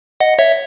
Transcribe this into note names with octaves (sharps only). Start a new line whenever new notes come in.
D#5 F#5
C#5 E5